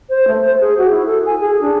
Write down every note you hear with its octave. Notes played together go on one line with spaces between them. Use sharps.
C5
A3
C5
G#4
F#4
E4
A4
G#5
G#4
D4